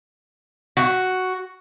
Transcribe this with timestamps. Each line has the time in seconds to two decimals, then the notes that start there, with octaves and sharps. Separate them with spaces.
0.77 F#4